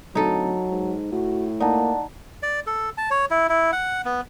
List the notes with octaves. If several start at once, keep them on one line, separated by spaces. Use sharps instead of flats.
D1 F#3 D#4 A4
G#2
A2 F#4
A#3 D#4 D5 F#5 A5
D5
A4
A5
C#5
E4
E4
F#5
B3